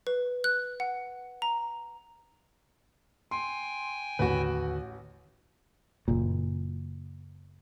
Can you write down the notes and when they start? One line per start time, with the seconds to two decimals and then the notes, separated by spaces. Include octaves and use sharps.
0.07 B4
0.44 F#6
0.80 F#5
1.42 A#5
3.31 G5 G#5 C6
4.19 A1 D#2 D3 F#4 B4
6.08 F#1 A#2